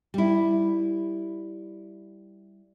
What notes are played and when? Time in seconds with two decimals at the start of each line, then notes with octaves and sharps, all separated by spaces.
0.14 G3 E4